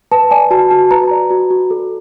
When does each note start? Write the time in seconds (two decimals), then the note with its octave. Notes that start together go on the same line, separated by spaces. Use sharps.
0.12 B4 A5
0.31 D5 G#5
0.51 F#4 A5
0.71 F#4 A5
0.91 B4 A#5
1.11 D5
1.30 F#4
1.50 F#4
1.71 A4